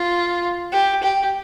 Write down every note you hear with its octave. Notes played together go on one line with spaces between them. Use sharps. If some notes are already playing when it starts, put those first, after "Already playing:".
Already playing: F4
G4
G4